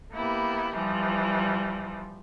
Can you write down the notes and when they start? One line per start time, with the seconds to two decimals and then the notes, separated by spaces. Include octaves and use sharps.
0.13 A#3 B3 E4 G4
0.76 E3 F3 G3